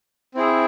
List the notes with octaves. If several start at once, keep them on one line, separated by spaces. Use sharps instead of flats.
C4 E4 G#4